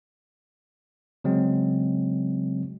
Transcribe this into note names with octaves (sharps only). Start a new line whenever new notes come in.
C#3 F#3 G#3 C4